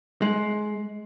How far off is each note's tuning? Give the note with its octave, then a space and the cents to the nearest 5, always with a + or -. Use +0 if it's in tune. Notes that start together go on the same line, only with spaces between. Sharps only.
G#3 +20